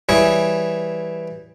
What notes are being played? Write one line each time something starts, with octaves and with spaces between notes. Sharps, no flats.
E3 G3 E4 G#4 C#5